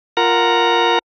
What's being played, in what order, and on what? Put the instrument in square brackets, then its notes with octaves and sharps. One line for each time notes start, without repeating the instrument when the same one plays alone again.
[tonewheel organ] F4 A#4 F#5 A#5